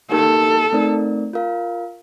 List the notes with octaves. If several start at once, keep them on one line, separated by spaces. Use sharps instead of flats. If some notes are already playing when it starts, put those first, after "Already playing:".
A#3 D#4 G4 A4 A#4
A3 C4 D#4 A#4 D5
F4 A#4 F5